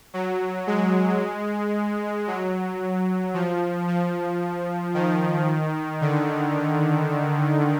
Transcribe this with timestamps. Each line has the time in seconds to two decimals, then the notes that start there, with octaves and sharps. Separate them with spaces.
0.14 F#3
0.67 G#3
2.27 F#3
3.34 F3
3.88 F3
4.94 D#3
6.01 D3